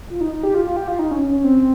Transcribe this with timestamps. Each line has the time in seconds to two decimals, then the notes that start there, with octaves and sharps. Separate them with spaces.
0.10 F4
0.21 D#4
0.32 D#4
0.43 G4
0.54 F4
0.65 F4
0.76 G4
0.88 F4
0.99 D#4
1.11 C#4
1.22 C#4
1.33 C#4
1.44 C4